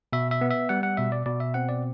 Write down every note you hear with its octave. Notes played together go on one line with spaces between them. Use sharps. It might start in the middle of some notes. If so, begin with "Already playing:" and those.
B2 E5
E5
B3
E5
G3 F#5
F#5
B2 E5
D5
B2 D5
E5
C4 F#5
D5